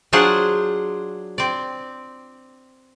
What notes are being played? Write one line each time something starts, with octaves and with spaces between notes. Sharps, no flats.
F#3 D4 F4 G#4 C5 F#5
C4 D5